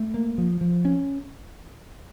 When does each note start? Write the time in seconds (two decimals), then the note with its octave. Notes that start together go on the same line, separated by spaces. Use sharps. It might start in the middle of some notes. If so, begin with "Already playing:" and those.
Already playing: A3
0.14 A#3
0.38 F3
0.61 F3
0.85 C#4